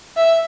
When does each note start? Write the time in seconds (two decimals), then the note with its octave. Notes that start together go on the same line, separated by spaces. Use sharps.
0.16 E5